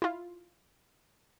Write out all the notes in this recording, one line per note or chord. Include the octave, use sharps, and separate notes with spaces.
E4 F4